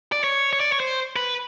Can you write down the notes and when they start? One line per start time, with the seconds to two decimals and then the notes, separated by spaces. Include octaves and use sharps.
0.12 D5
0.24 C#5
0.53 C#5
0.60 D5
0.72 C#5
0.80 C5
1.16 B4